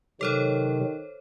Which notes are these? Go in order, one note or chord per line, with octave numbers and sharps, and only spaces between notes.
C3 D#3 F#3 A4 C5 C#5